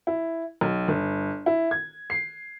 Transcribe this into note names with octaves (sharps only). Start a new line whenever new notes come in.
E4
B1
G1
E4
G#6
C7